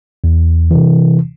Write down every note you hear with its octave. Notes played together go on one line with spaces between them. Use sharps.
E2
C3 E3